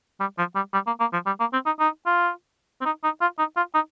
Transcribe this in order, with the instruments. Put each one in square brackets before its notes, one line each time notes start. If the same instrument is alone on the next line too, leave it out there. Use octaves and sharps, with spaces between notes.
[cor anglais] G3
F3
G3
G3
A#3
A#3
F3
G3
A#3
C4
D#4
D#4
F4
C4
D#4
D#4
F4
D#4
F4
D#4